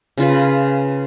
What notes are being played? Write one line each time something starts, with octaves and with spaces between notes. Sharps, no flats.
C#3 F4 B4